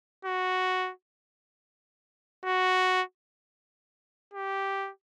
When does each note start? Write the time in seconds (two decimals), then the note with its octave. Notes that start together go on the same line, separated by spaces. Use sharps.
0.25 F#4
2.45 F#4
4.34 G4